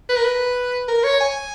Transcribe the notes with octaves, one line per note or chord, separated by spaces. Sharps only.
B4
A#4
B4
A#4
C#5
G#5